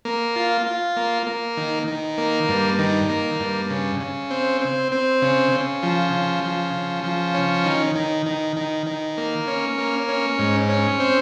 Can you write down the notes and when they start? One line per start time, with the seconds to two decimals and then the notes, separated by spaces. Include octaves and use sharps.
0.05 A#3
0.36 F4
0.66 F4
0.97 A#3
1.27 A#3
1.57 D#3
1.88 D#3
2.18 A#3
2.48 G2
2.79 D#3
3.09 A#3
3.40 G2
3.70 C#3
4.00 C#3
4.30 C4
4.61 C4
4.92 C4
5.22 C#3
5.52 C#3
5.83 F3
6.13 C#3
6.44 F3
6.74 C#3
7.04 F3
7.34 C#4
7.65 D#3
7.95 D#3
8.26 D#3
8.57 D#3
8.87 D#3
9.17 A#3
9.47 C#4
9.78 A#3
10.08 C#4
10.39 G#2
10.69 C#4
10.99 C4